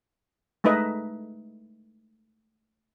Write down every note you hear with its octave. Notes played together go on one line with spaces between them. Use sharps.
G#3 A3 D#4 B4 D#5 E5